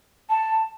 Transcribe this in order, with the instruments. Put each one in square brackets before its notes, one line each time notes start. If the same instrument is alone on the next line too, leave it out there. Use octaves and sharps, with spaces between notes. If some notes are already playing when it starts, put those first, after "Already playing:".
[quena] A5